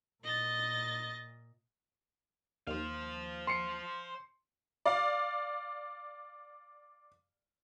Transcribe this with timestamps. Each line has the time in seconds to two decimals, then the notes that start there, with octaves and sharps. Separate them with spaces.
0.24 A#2 D#5 A6
2.67 D#2 C5 F5
3.47 C6 C7 C#7
4.86 D5 F5